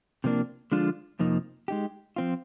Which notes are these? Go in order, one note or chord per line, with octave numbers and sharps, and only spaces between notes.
C3 F3 A#3 D4
D3 F3 G#3 D4 F4
F2 C3 F3 A#3 D#4
G#3 D#4 G4
F3 C4 F4